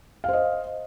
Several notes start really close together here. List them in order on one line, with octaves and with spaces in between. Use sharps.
F5 C5 D#5